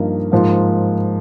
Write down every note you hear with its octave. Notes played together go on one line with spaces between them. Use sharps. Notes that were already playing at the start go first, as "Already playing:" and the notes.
Already playing: G2 F3 A#3 D#4
G#2 F3 A#3